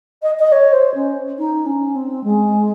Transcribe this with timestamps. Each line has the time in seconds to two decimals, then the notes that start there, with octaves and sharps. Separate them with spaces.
0.22 D#5
0.39 D#5
0.52 C#5
0.72 C5
0.94 C#4
1.38 D#4
1.65 C#4
1.95 C4
2.23 G#3